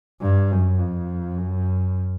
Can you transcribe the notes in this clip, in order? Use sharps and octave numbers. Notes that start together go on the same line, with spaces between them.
G2
F#2
F2
F#2